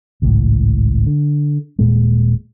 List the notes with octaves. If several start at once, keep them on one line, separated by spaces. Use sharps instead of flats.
G#1 C#2 A2
D3
D#1 A#2 G#3